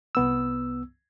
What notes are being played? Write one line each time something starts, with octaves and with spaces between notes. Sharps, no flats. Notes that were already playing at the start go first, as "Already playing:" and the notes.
C2 B3 E6